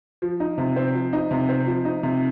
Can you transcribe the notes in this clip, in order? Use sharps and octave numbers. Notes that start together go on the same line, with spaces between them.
F3
D#4
C3
C4
F3
D#4
C3
C4
F3
D#4
C3